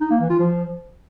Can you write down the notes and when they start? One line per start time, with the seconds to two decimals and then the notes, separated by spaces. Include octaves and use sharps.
0.01 D#4
0.10 A#3
0.20 E3
0.30 F4
0.39 F3